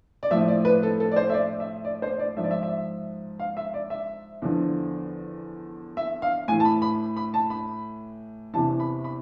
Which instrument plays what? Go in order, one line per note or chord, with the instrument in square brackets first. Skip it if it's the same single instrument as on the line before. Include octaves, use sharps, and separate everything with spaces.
[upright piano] D5
A2 F3 E5
D5
B4
A4
A4
D5
C5
E5
D5
E5
D5
C5
D5
G#2 F3 E5
D5
E5
E5
F5
E5
D5
E5
E2 D3 F3
E5
F5
A2 G#5
E3
A5
B5
B5
B5
A5
B5
E2 C3 E3 A5
B5
B5